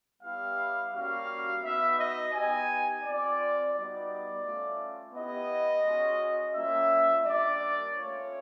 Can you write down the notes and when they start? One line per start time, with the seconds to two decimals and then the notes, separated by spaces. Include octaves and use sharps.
0.23 G3 B3 E4 G4 F5
0.93 G3 A#3 C#4 F#4 F5
1.63 B3 D#4 F#4 E5
1.98 D#5
2.33 B3 D#4 G4 G#5
3.03 C4 F4 D5
3.74 G3 B3 D#4 F#4 D5
4.44 A3 C#4 F4
5.14 B3 E4 G4 D#5
5.84 G#3 C#4 F#4
6.54 G3 A#3 C#4 F4 E5
7.25 G3 A#3 D4 D5
7.95 A3 C#4 F4 C#5